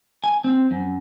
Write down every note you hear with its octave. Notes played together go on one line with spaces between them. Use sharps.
G#5
C4
F#2